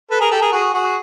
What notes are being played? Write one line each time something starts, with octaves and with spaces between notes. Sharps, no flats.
A4 B4
G#4 A#4
G4 A4
G#4 A#4
F#4 G#4
F#4 G#4